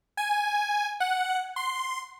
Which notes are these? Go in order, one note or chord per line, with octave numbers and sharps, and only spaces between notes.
G#5
F#5
C6